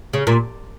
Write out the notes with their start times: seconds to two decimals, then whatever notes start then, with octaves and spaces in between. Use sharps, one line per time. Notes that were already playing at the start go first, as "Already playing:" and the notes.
0.13 C#3
0.27 A#2